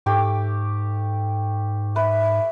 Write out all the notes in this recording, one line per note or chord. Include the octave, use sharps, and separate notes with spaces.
G#2 A3 G4 D6
B4 E5